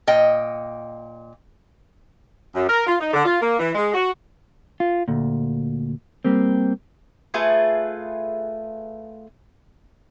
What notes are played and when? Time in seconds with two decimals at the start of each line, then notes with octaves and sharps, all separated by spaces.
0.07 A#2 D#5 G5
2.55 F#2
2.68 A#4
2.87 F4
3.00 D#4
3.13 D3
3.25 F4
3.41 A#3
3.59 E3
3.75 G#3
3.94 F#4
4.80 F4
5.08 D2 A#2
6.25 G3 A#3 C4
7.34 A3 F4 G#4 B4